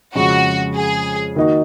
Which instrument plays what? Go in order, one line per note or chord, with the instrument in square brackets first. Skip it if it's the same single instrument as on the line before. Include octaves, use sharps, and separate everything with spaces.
[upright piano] F2 C#3 G#3 [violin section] F#4
[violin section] G#4
[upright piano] D#3 A#3 D#4 F#4